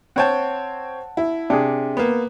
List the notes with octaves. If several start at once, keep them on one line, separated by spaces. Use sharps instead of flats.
C4 C#5 F#5 G5 A5
E4
C3 D4 G#4
A#3 B3